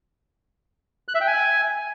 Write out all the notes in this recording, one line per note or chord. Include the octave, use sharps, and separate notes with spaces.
F#6
E5
G5
G#5